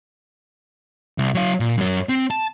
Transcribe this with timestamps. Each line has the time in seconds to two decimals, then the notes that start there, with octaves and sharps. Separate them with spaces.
1.18 C2
1.35 F#3 F5
1.60 A#2
1.78 F#2 F#3
2.09 C4
2.31 A5